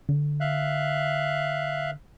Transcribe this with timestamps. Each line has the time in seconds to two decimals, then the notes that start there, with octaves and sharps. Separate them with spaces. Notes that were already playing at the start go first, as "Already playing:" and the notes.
0.09 D3
0.40 E5 F5 F#6